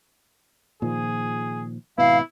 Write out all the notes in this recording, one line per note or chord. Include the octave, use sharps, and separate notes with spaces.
A#2 D#3 F3 G#4
G#1 B2 B3 E4 F5